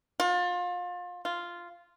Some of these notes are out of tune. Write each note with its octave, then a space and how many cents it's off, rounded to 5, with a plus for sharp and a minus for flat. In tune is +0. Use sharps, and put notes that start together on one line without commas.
F4 +30
F4 -5